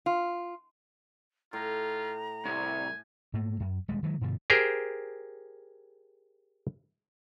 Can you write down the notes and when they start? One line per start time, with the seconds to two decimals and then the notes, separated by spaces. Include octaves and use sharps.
0.06 F4
1.53 A2 F4 A#5
2.45 C2 G#5
3.33 G#2 A3 A#3
3.60 F#2
3.88 D#1 G3 G#3
4.03 D#3 E3 F#3 G#3
4.21 G2 B2 D3 F3
4.50 G4 G#4 A#4 C5